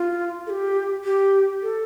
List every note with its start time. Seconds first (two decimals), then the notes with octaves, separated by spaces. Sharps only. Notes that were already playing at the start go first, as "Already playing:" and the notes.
Already playing: F4
0.47 A4
0.50 G4
1.04 G4
1.62 A4